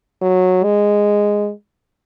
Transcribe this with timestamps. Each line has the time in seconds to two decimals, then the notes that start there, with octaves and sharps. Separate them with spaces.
0.22 F#3
0.64 G#3